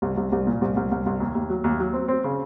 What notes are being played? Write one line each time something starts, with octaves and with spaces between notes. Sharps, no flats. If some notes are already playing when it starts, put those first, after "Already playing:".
C2
C2
C2
A#2
C2
C2
C2
C2
D#2
D#2
F#3
D#2
F#3
C4
C4
C#3